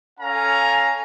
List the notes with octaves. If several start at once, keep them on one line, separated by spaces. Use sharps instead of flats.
C#4 A4 F5 G#5 A#5